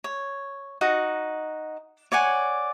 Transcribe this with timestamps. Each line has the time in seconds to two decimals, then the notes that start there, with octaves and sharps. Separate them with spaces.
0.04 C#5
0.81 D#4 F#4 F#5
2.12 C#5 D5 F#5 G#5